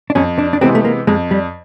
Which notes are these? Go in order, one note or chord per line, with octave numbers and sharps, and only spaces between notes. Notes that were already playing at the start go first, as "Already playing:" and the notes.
D4
F2 C#4
D4
D4
C3 E3 G#3 B3 C4
A3
A#3
F2 G#3
G3